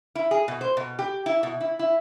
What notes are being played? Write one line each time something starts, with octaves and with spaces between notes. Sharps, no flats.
E4
G#4
B2
C5
B2
G4
E4
B2
E4
E4